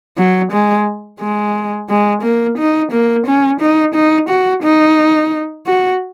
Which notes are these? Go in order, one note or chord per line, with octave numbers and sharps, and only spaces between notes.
F#3
G#3
G#3
G#3
A#3
D#4
A#3
C#4
D#4
D#4
F#4
D#4
F#4